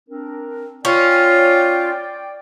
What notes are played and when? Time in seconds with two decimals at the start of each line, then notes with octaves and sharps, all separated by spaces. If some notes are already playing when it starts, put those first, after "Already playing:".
0.08 C4 D4 A#4
0.85 C#4 F4 D5 G5